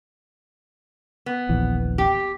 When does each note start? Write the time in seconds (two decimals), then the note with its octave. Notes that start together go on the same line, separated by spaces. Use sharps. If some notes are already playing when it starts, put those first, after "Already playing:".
1.26 B3
1.49 D#1 A#1 E3
1.98 G4